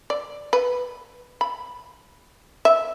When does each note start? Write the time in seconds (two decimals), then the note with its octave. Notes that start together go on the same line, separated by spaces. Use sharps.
0.10 D5
0.53 B4
1.41 B5
2.65 E5